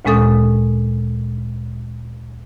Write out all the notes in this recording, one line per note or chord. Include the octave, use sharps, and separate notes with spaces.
D2 A#2 G#3 C#4 A4 D#6